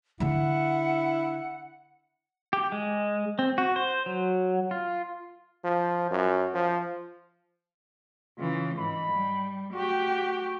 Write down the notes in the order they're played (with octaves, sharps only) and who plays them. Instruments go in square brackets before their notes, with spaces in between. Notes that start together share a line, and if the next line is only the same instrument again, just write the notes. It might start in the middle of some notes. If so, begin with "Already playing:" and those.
[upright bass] D3 D4 [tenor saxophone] E4 [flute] F#5
[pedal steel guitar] G4
G#3
C4
F#4
C5
F#3
F4
[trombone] F3
F#2
F3
[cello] C#3 E3 [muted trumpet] F4
[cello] G#2 E3 [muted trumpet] B5
[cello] G3
[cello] A3 G4 [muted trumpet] F#4